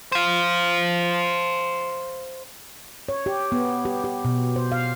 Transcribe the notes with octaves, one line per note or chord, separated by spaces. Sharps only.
C5 F5
C#5
G4
B3
G4
G4
B2
C5
F5